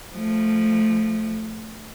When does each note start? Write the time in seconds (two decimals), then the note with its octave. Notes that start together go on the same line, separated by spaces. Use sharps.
0.16 F3 A3